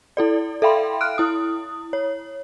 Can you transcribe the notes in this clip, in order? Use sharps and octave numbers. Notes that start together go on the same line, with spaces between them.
E4 A4 D5
A4 E5 F5 G5 B5 C6
F6 F#6 D7
E4 D#6
C#5